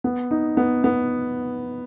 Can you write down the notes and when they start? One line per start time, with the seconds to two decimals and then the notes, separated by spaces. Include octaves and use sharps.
0.04 B3
0.31 D#4
0.57 B3
0.84 B3